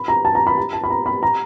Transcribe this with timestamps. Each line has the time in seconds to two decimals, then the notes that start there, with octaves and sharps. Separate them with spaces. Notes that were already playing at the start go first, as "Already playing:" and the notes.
Already playing: B5
0.08 A#5
0.25 A5
0.35 A#5
0.47 B5
0.58 A#5
0.73 A5
0.84 B5
0.90 A#5
1.06 B5
1.23 A#5